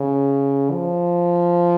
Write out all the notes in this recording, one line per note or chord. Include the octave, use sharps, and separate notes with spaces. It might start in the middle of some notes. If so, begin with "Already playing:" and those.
Already playing: C#3
F3